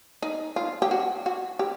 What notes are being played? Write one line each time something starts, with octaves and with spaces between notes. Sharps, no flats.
D#4
F4
G4
F#4
F#4
G4